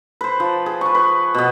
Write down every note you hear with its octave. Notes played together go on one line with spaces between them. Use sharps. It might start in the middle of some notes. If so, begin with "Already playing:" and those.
B4 C5
F3
G#4
B4 C#6
B4
B2 B3